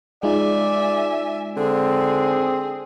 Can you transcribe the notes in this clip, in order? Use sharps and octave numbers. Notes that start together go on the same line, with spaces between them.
G#3 D#4 F4 D5 E5 G#5
D3 C4 G#4